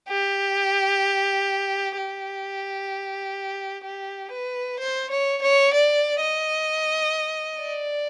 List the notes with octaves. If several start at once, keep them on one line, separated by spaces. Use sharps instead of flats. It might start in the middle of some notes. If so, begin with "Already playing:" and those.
G4
G4
G4
B4
C5
C#5
C#5
D5
D#5
D5